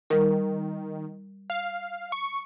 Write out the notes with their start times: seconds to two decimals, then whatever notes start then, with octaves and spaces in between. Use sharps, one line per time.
0.10 D#3 G3 A#4
1.50 F5
2.12 C#6